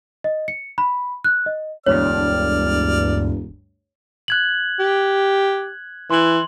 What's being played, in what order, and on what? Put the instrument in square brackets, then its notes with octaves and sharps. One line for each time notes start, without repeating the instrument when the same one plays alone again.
[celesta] D#5
C#7
B5
F#6
D#5
[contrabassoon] E1 [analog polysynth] D2 G2 [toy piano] C#5 [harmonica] D5 F6
[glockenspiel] F#6 G#6 F#7
[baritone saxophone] G4
[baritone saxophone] E3 [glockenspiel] C6 F#7